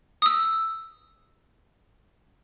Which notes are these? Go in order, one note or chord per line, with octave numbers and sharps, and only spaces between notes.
D#6 E6